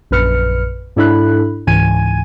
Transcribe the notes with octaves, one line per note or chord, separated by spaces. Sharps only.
A#1 F#2 B4 F6 C#7
G#2 D4 E4 A4 B5 F#6
C#2 G#2 E3 G#5 G#6 D#7